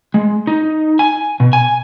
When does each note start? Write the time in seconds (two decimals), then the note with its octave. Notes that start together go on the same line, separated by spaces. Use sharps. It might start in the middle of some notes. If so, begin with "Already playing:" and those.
0.14 G#3
0.47 D#4
0.99 G#5
1.40 B2
1.53 G#5